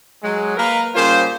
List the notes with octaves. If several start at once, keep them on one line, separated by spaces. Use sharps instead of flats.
F#3 G#3
A#3 A#4 B4
C#3 G3 A#3 F4 C5